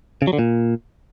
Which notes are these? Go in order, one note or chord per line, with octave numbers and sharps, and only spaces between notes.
C#3
F#3
D3
A#2